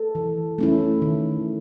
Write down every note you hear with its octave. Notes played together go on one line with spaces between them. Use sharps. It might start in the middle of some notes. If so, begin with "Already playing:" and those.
Already playing: A4
E3
A3 C#4 E4
D#3